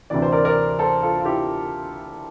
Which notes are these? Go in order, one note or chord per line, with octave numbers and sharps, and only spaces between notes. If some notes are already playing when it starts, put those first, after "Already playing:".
D2 C3 E3 D5
C5
A#4 D5
A#4 D5
A4 C5
F4 A4
F4
E4 G4